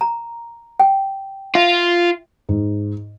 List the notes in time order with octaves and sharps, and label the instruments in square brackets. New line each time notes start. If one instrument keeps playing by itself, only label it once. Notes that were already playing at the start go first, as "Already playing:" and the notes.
[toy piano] A#5
G5
[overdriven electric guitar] F4 [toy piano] E5
[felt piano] G#2